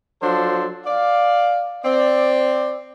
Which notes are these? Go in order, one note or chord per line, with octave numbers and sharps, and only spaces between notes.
F3 F#3 D4 F4 A4 C5
D5 F5
C4 D5